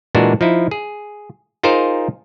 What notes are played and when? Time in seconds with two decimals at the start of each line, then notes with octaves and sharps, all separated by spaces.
0.15 A#2 E3 G#3 D4 F#4
0.41 F3 D#4 E4
0.71 G#4
1.63 D#4 F4 G#4 A#4 C5